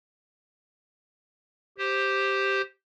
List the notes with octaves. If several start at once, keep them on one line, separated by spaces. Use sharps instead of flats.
G4 C5